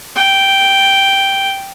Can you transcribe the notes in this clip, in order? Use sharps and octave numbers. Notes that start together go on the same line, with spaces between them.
G5